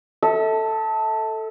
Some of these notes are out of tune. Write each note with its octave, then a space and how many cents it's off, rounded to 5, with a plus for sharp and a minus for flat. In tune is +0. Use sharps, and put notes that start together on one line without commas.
A4 +5 E5 -40